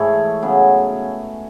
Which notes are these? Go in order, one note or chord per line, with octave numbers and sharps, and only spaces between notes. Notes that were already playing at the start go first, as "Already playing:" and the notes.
Already playing: G#2 E3 A3 C#5
C#3 F#3 B3